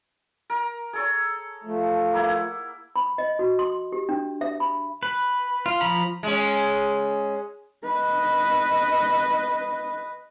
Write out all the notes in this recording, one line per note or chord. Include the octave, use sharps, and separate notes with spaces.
A#4
G#4 A4 C#5
F3 A3
A#3 E4 F#5
B5
D#5
F#4
C6
G4
D4
E5
B5
B4
F4
F3 A#5 B5
G#3 C#4
B4 D#5